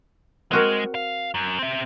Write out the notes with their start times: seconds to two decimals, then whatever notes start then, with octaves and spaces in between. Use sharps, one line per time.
0.51 G#3 C4 F#4 A#4
0.95 F5
1.34 F#2
1.59 C4 E5